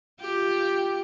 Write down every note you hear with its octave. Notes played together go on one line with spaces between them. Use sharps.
F4 G4